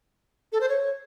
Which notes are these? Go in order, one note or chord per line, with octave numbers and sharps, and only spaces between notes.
A4
C5
C#5